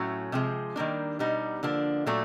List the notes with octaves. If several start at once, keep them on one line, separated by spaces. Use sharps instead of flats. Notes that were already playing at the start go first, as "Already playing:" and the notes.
Already playing: A2 F#3 A3 C#4
C3 F3 G#3
D#3 G3 A#3 D4
B2 G3 B3 D#4
D3 F3 A#3 D4
A#2 F#3 A3 D4